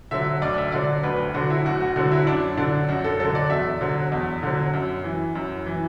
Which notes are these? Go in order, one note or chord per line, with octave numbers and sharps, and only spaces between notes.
D3 F#3 E5
D2 D5
E5
D3 F#3 D5
D2 B4
D3 F#3 F#4
E4
D2 F#4
F#4
D3 F#3 F#4
E4
F#2 D4
D3 F#3 D4
F#2 F#4
A4
D3 F#3 A4
D5
E2 E5
D3 F#3
E2
D3 F#3
F#2
E3
F#2
E3